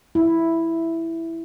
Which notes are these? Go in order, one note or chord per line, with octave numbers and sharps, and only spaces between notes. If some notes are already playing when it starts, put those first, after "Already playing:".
E4